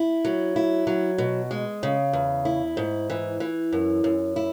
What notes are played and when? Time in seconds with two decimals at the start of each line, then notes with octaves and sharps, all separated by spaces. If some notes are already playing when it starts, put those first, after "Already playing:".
Already playing: E4
0.25 F#3
0.56 E4
0.87 F#3
1.18 B2
1.51 G#3
1.83 C#3
2.13 E2
2.45 E4
2.77 G#2
3.10 E3
3.40 E3
3.73 F#2
4.04 F#2
4.36 E4